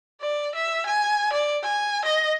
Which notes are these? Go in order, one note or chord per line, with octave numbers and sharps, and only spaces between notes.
D5
E5
G#5
D5
G#5
D#5